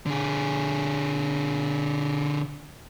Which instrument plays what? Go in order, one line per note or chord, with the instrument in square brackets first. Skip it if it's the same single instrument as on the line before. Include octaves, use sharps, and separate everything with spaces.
[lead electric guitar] D3 G#4